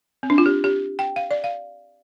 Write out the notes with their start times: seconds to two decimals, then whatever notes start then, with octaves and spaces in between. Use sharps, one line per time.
0.23 C4
0.30 D4
0.38 F4
0.46 G4
0.64 G4
0.99 G5
1.16 F5
1.31 D5
1.44 F5